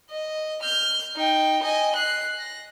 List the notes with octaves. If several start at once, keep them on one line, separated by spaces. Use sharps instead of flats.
D#5
F6 G6
D#4 G5
D#5 G#5
F#6 C7
A#6